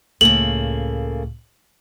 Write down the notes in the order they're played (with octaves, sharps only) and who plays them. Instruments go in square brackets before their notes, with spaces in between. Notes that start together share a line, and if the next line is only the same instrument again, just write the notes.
[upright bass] C#2 A2 [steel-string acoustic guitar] C#3 A3 A#3 [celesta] F#7